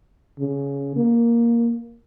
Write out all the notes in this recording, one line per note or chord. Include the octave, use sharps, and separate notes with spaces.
C#3
A#3